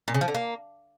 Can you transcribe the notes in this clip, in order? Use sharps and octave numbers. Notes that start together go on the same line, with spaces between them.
A#2
C#3
F3
D3
A#3